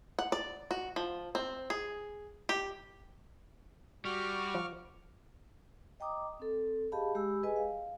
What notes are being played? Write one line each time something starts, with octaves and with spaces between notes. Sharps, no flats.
F#5
D5
F#4
F3
C4
G#4
G4
G3 F#4 C#6 D6 F6
F3
D#5 G5 A#5 D6 D#6
C4 A4
G4 G#4 D#5 F5 A5 B5
G#3 G4 B5 E6
G#4 B4 D#5 G#5
F5